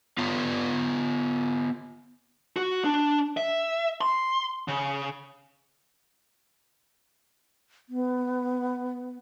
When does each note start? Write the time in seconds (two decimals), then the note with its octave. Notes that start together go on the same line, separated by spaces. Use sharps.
0.18 B3 F4 B4 C#5
2.56 F#4
2.84 D4
3.37 E5
4.01 C6
4.68 C#3
7.89 B3